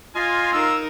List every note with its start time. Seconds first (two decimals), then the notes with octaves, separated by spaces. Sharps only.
0.15 F4 D#5 G#5 C6
0.53 D#4 A#4 E6